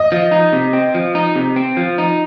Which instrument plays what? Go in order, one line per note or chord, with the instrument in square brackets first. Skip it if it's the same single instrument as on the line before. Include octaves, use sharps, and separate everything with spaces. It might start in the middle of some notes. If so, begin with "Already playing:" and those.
Already playing: [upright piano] D#5
[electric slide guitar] F3
D#4
C3
C4
F3
D#4
C3
C4
F3
D#4